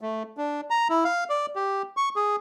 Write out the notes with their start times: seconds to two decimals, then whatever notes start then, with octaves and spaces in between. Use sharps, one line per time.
0.01 A3
0.37 D4
0.70 A#5
0.89 E4
1.04 F5
1.30 D5
1.56 G4
1.97 C#6
2.16 G#4